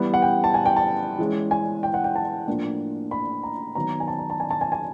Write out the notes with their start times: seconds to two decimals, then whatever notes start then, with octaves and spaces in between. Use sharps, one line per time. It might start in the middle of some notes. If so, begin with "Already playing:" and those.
Already playing: E3 G3 B3
0.14 F#5
0.22 G5
0.44 A5
0.54 G#5
0.66 G5
0.76 A5
1.18 E3 G#3 C#4
1.51 G#5
1.83 G5
1.94 F#5
2.04 G5
2.16 A5
2.47 A2 F3 A#3 D4
3.11 B5
3.43 A#5
3.75 D#3 F#3 B3 A#5
4.00 G#5
4.08 A5
4.18 A#5
4.30 A5
4.40 G#5
4.51 A5
4.61 G#5
4.72 G#5